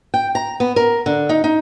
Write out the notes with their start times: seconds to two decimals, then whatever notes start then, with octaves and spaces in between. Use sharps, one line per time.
0.14 G5
0.35 A#5
0.60 B3
0.76 A#4
1.06 D3
1.29 D#4
1.44 D#4